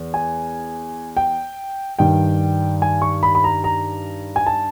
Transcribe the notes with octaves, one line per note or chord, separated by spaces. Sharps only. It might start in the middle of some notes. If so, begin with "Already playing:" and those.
Already playing: E2
G#5
G5
G2 D#3 G5
G#5
C#6
B5
B5
A#5
A#5
G#5
A5